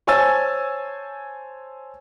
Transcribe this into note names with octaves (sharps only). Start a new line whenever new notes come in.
C5 C#5 G#5 A5 E6 A6